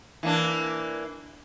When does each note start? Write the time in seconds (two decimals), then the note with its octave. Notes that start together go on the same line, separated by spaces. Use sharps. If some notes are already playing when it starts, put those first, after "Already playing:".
0.23 E3 A#3 D4